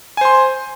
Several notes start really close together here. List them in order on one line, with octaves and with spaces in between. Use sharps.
G#5 C5 C6